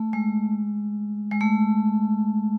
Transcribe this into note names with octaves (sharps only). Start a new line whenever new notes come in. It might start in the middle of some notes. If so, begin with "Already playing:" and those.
Already playing: A3
G#3
G#3
A3